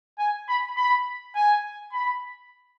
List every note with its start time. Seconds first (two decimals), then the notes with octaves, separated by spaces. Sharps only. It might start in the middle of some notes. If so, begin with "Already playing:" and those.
0.19 G#5
0.48 B5
0.77 B5
1.35 G#5
1.92 B5